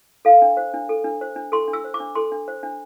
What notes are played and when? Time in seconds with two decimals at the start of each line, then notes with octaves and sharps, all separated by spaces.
0.25 A4 F5
0.42 D4
0.57 C5
0.74 D4
0.89 A4
1.04 D4
1.21 C5
1.36 D4
1.52 A4 C6
1.68 D4
1.73 E6
1.85 C5
1.94 D6
2.00 D4
2.15 A4 C6
2.32 D4
2.48 C5
2.63 D4